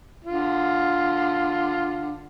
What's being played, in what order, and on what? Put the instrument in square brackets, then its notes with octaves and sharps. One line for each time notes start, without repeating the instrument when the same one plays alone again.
[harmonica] D3 F4